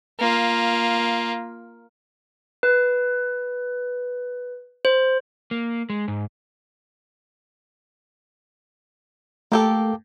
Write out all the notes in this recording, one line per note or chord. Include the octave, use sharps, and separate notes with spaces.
A#3 F4
B4
C5
A#3
G#3
G#2
A3 A#3 G4 A4